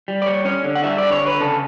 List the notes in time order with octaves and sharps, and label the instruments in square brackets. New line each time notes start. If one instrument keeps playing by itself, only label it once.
[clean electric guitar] G3
D5
G3 C#5
C#4 C#5
D3
F#5
G3 E5
D3 D5
C#5
D3 B4
C#3 A4